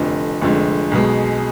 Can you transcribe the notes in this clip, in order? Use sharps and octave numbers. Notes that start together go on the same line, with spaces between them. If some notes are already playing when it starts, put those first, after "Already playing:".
Already playing: F1 F2 D3
F1 F2 D3 G#3
B1 B2 G#3